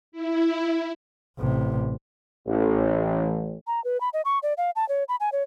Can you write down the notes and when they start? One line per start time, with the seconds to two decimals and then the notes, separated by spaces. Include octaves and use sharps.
0.12 E4
1.39 A1 C3
2.47 A1
3.67 A#5
3.84 B4
4.01 B5
4.13 D#5
4.25 C#6
4.43 D5
4.58 F5
4.76 A5
4.89 C#5
5.09 B5
5.20 G#5
5.32 C#5